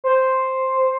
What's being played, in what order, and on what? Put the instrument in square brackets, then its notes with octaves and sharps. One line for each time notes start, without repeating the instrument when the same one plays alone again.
[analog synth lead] C5